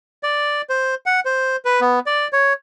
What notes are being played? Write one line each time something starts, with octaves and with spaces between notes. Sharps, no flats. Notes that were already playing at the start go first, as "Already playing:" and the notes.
D5
C5
F#5
C5
B4
B3
D5
C#5